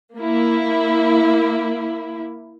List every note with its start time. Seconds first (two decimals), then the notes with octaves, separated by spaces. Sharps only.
0.17 A#3 E4